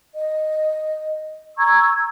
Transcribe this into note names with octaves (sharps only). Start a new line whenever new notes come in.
D#5
A#5 C#6 E6 G#6